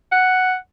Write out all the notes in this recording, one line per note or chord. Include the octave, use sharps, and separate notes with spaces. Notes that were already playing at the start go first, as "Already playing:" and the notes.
F#5